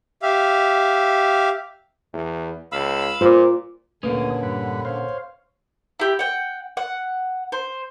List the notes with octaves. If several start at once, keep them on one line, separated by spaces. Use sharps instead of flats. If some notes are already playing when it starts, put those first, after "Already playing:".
G4 E5 F5
E2
C#2 F5 B5 E6
A#2 F4 C5 D6
D2 A#2 D3 A#3 C#4 B4 C#5 D#6
G2 F#5 B5
C5 C#5 F5
E4 G4
F#5 G5
F#5
C5